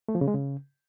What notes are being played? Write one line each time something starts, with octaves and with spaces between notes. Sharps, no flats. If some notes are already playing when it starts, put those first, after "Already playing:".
A3
F3
C#3
G#3
C#3